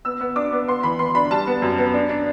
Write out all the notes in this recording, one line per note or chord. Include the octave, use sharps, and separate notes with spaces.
B3 E6
B3
D4 D6
B3
B3 C6
E3 B5
B3 C6
D4 B5
G3 A5
B3
F#2
B3
D4
D4